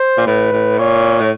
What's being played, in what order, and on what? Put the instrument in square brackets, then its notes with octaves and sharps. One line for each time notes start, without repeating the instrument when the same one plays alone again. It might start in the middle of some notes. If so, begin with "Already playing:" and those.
Already playing: [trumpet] C5
[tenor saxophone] A#2
[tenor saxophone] A2 [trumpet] B4
[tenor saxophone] A2
[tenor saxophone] A#2 [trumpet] C#5
[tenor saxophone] A2